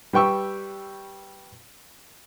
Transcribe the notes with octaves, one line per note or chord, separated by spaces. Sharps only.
G3 B4 G5 C#6 E6